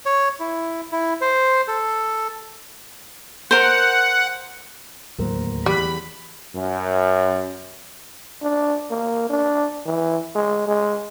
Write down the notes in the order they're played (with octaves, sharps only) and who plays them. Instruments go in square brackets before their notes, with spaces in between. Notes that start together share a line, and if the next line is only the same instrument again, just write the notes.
[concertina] C#5
E4
E4
C5
A4
[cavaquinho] A#4 C5 [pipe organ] F#5
[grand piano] D1 A#4 C5 [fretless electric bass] D#2 F#3 A#3
[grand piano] E2 F#6 [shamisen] G3 [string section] B5
[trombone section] F#2
[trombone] D4
A#3
D4
E3
G#3
G#3